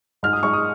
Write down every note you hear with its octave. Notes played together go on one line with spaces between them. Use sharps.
G#2 F6
D#6
G#3 D#4 C#6
D#6